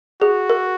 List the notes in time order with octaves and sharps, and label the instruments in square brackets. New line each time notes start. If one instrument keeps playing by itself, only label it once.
[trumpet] F#4 [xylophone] G#4
[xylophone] A#4